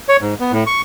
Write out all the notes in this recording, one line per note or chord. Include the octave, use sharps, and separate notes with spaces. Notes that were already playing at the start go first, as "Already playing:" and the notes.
C#5
G#2
B3
A2
C#6